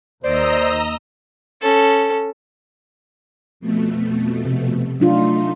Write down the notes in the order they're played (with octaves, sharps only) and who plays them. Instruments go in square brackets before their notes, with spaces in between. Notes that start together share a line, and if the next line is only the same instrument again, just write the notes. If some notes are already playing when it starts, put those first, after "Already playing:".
[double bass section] D#2 [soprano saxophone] C5 [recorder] D5 [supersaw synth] D#5 A#5 E6
[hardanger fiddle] C#4 A4
[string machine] F2 B2 A3
[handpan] C3
[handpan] F#3 D4 F4 [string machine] A3 D#4